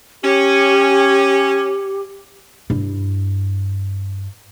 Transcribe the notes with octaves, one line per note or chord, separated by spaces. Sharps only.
C#4 G4
G2 E4